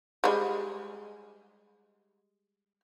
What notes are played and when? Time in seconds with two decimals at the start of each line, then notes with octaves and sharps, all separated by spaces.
0.24 G3 G#3